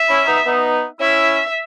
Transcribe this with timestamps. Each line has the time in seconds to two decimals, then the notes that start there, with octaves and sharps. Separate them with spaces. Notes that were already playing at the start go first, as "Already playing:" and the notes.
Already playing: E5
0.09 C#4 E4
0.27 B3 D#4
0.46 B3 D#4
1.00 C#4 E4 E5